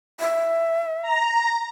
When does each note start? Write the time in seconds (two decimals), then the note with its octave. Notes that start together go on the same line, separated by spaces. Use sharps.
0.20 E5
1.02 A#5